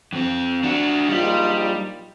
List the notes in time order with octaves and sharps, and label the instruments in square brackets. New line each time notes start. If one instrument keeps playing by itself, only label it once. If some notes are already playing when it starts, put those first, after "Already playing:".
[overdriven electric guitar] F2 C4
D4 F#4
[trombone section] A#1 D#4 F4 [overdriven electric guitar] G3